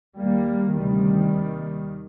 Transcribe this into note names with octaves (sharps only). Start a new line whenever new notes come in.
D#2 G3 A#3
D2 C3 D#3 G3
D#2